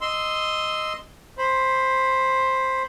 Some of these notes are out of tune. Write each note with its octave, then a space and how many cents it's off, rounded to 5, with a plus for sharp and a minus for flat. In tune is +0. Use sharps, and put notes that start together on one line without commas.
D#5 +0 C6 -5 E6 -5
C5 +10 B5 +0